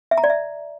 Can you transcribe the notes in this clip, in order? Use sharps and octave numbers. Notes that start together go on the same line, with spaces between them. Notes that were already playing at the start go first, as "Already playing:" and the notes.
E5
A#5
D5
E5